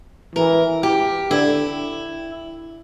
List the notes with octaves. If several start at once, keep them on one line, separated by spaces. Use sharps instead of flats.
E3 A#4
G4
D3 E4